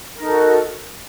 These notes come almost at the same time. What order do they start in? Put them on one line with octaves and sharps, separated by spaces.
A#4 D#4 A4 F#4